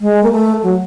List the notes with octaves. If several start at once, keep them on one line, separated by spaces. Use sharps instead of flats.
G#3
A#3
A3
F#3